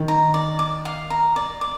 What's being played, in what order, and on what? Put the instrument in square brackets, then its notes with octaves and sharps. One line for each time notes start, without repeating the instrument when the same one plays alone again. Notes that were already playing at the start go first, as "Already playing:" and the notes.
Already playing: [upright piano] D#3
[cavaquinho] A#5
D5
D6
F5
A#5
D5
D6